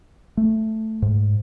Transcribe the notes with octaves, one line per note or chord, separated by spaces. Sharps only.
A3
G#2